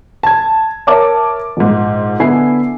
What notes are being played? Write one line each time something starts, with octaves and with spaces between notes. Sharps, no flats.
A5 G#6
A#4 C#5 E5 A5 D6
A#1 G#2
D3 B3 E4 G#5 C7